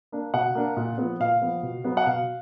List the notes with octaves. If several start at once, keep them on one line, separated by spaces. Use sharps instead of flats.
A#3 D4
B2 F#5
A#3 D4
A#2
F3 B3
A#2 F5
F3 B3
B2
F#3 B3
F#5
B2 F5